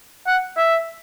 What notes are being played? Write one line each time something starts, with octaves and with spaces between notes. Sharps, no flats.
F#5
E5